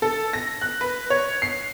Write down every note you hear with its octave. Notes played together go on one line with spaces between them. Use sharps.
A4
A#6
F#6
B4
C#5
C7